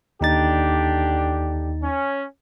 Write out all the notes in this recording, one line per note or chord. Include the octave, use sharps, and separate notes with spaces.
D#2 D3 D4 D#4 G4 A6
C#4